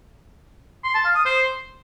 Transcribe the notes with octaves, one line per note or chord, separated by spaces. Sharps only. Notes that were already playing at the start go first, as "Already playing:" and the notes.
C6
A5
F5
D#6
C5